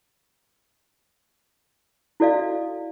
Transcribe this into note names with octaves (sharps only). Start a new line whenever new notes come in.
E4 F#4 A4 D5 D#5 F5